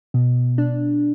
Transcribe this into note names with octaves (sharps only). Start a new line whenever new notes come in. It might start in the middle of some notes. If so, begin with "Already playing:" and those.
B2
D4